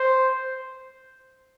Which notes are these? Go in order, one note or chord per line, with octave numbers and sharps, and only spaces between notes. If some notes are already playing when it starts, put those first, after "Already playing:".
Already playing: C5